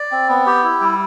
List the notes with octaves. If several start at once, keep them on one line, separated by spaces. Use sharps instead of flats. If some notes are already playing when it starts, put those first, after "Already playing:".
Already playing: D5
C4
B3
G4
E4
G3